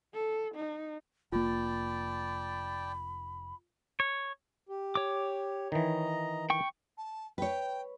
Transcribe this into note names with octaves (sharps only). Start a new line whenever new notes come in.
A4
D#4
F1 A#3 F4 D5 G5 A5 B5
C#5
G4
C#5 D6
D#3 E3 D#5 A#5
G5 C#6
A5
B4 C#5 G5